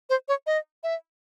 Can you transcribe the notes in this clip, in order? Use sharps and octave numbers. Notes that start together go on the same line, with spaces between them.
C5
C#5
D#5
E5